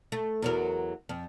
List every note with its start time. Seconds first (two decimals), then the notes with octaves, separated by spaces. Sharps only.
0.12 A3
0.42 E2 F#3 A#4
1.09 F2